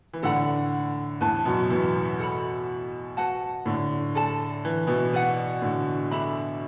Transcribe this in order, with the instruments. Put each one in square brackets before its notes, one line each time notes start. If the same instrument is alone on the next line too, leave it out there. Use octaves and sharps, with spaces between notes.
[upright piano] E3
[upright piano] A2 D3 [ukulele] A4 D5 F#5 B5
[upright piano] E2 A2 [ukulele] B4 E5 A5
[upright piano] F#2 B2
B2 E3
[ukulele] A4 F#5 B5
F#4 B4 F#5 A5
[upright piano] A2 D3
[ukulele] A4 D5 A5
[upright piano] E3
B2 E3
[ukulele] B4 D5 F#5
[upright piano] A2 D3
[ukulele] D4 A4 E5 B5